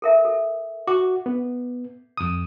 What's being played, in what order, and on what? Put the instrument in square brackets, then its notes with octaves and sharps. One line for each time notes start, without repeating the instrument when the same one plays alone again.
[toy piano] A4 A#4 E5
A4
[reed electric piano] F#4 [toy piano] D6
[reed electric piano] B3
F2 D#6